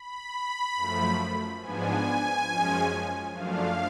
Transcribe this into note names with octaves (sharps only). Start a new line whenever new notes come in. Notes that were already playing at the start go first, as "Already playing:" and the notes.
Already playing: B5
F#2 F3 A3
G#2 F3 B3 D4 G#5
F#2 F3 G#3 C#4
F#2 F3 A3 D4 F5